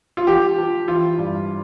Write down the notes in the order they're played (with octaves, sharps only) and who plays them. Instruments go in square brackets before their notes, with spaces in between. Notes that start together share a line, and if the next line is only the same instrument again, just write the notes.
[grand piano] F4
F3 G4
F3
E3 F4
G2